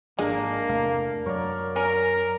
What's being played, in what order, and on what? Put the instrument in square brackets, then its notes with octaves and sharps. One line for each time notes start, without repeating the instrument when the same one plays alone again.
[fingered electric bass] G#1 F3 [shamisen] G#3 [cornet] A#3 [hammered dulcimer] D4 A#4
[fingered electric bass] E2 C3 A3 [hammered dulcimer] F5
[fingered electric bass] F#2 F#3 [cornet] A#4 [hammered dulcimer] C#5 D5
[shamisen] C#4 [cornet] A#4